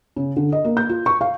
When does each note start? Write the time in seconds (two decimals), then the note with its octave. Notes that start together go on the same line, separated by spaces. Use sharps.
0.16 C#3
0.36 D3
0.52 D#5
0.65 A#3
0.77 G6
0.89 F4
1.06 C#6
1.21 F5